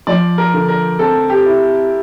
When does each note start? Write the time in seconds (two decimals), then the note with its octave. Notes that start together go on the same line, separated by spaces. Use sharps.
0.07 F3 D5
0.38 A#4
0.54 D3
0.68 A#4
0.99 C4 A4
1.30 G4
1.46 E4